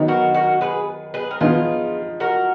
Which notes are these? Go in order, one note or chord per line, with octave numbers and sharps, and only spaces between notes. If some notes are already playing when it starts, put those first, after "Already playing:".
Already playing: D#3 F#3 B3 D#4
F#4 A#4
F#4 A#4
G#4 B4
G#4 B4
A#4
F3 B3 D#4 F4 G#4
F#4 A#4